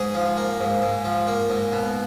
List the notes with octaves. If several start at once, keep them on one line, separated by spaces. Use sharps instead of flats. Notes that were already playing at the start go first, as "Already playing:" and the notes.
Already playing: G#2 G#4
F3
A#3
G#2
G#2
F3
A#3
G#2
B2